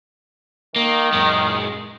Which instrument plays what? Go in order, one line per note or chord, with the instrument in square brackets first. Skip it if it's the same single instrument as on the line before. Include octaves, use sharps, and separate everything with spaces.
[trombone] D#3 [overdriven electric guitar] A#3
[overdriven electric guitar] F#2 G#3